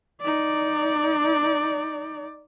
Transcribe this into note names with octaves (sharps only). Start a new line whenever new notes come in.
D#4 D5